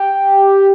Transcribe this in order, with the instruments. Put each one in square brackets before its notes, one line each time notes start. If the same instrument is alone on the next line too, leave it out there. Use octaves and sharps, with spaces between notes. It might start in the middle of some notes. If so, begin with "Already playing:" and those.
Already playing: [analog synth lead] G4